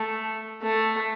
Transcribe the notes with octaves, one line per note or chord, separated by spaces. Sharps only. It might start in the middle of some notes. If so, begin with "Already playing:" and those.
Already playing: A3
A3